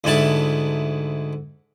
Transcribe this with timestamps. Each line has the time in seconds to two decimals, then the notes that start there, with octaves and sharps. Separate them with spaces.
0.04 D2 G#2 E4 A5